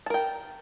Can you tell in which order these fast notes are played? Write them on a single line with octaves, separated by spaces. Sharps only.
A5 A#4 G5